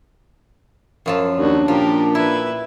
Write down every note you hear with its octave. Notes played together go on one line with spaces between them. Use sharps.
F#2 F3 A5
D#2 D4 F#4
A#2 F3 G4 A#4
E4 B4 E5